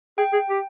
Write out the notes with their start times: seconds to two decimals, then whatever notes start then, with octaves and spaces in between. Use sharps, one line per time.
0.18 G#4 G5
0.33 G#4
0.50 G4